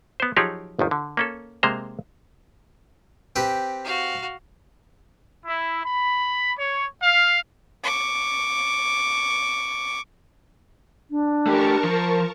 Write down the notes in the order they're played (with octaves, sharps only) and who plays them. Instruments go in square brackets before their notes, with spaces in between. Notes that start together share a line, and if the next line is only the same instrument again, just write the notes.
[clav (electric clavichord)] B3 C5
F3 F#3 D#4 G4 G#4 C#5
G1 D#2 D#3
D3
A#3 C#4 A4
C3 G#3 A#3 C5 A#5
[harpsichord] C4 G4 B4
[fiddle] F#4 F5
[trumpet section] E4
B5
C#5
F5
[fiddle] C#6 D6
[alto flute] D4
[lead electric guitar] A3 G4 [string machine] A#4 A5 C#6
[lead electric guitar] F3